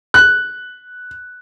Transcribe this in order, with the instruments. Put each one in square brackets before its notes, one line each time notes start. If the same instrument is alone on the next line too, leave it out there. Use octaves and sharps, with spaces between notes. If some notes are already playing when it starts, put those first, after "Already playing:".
[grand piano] F#6